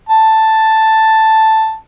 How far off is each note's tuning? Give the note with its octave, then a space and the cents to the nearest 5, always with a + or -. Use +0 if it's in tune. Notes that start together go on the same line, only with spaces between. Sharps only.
A5 +5